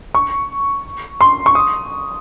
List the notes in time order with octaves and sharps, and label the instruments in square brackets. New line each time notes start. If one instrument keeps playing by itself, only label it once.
[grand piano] C#6
C6
C#6
D#6